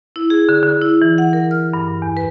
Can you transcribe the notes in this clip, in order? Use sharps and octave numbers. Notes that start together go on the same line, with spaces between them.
E4
G#4
D3
D3
E4
E3
F#5
A#4
F6
G2
E2
B4